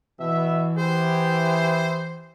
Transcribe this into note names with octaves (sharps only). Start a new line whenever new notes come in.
B2 E3 E5
B3 E4 G4 C5